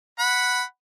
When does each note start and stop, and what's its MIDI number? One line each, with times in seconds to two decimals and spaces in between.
0.19 0.63 78
0.19 0.63 83